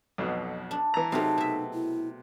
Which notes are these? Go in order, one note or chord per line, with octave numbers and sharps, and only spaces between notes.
B1 F2 B2
D4
E3 A#5
C3 F#3 A3 D#4 G#4 F5
B2 E5
E4